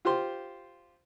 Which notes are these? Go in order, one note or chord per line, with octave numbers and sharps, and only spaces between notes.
F4 G4 C5 C6